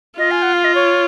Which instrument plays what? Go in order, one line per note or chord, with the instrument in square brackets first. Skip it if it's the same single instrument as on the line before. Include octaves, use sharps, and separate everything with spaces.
[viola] F4 [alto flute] D#5
[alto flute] G#5
F#5
F5
D#5
C#5